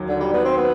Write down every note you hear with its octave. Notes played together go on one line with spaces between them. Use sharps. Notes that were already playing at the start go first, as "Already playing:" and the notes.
Already playing: D#2 F#3
D3
G3
B3
C4
B3